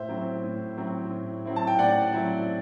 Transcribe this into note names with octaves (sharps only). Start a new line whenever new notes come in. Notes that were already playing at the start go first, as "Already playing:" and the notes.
Already playing: A2 C5 E5
F#3 C4 E4
A2
F#3 C4 E4
A2
F#3 C4 E4
A5
G5
A2 D5 F#5
F#3 C4 E4